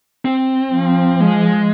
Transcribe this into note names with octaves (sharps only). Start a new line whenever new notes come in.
C4
F3
G#3